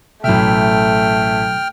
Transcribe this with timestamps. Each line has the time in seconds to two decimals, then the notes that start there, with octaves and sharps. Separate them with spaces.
0.24 A1 B2 F#3 A3 E5 G5 F6